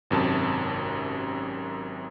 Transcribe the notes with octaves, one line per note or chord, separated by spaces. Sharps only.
G#1 F#2 C3 A5